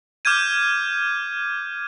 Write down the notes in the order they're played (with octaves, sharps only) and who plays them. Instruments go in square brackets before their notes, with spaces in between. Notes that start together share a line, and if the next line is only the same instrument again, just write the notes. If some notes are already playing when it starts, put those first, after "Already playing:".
[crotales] D6 F6 G6 G#6 D#7